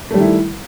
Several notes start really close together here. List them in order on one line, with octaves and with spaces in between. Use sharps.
A3 G3 D#3 E4